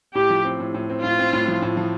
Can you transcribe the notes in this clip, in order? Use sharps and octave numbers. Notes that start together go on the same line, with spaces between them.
A2 G4
F3
C4
A2
A2
C4
A2 F4
C4
A2
F3
A2
F3